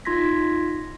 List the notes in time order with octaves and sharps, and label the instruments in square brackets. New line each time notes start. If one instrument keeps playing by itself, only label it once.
[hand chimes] D#4 F4 C6 G#6 A#6 B6